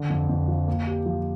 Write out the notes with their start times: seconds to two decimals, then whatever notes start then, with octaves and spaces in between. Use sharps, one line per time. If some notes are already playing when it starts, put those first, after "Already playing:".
Already playing: D3
0.10 F2
0.29 F2
0.48 F3
0.68 A#3
0.87 G4
1.06 F3